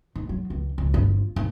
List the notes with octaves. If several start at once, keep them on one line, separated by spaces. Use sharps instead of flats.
D#3
F#3
C#2
C#2
G1
F4
D#2